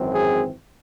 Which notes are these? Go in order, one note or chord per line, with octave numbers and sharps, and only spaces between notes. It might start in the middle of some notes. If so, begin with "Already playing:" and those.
Already playing: G#1 F#2 E3 C4
G#4